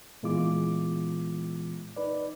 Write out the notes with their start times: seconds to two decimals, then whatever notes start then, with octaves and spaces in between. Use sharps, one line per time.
0.23 A#2 E3 G#3 B3 F4 D6
1.96 D#4 B4 D5